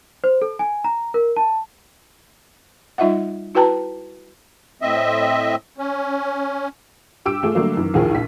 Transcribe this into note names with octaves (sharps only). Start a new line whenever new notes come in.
C5
A4
G#5
A#5
A#4
A5
G3 D#4 F4 D#5 E5 F#5
E4 F#4 B4 G5 A5 A#5
A2 C4 D#5 E5
C#4
G2 G4 D6 E6 D7
A3 F4 G#4
D3 F#3 G3 A3 A#3
F#2 D#3 E3
A#1 D#2 A2 F3 G#4 A#4
A#1 F4 B6